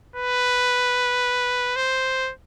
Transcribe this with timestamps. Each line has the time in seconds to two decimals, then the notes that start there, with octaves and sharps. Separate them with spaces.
0.16 B4
1.76 C5